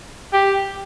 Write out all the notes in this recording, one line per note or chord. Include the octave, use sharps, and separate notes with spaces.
G4